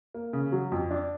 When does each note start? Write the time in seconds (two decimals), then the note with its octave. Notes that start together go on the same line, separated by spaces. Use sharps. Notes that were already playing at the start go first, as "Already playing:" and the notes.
0.14 A#3
0.33 C#3
0.52 F#3
0.72 F2
0.91 D4